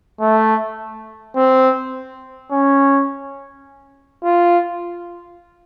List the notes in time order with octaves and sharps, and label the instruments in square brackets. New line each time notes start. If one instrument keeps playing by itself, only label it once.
[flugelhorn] A3
C4
C#4
F4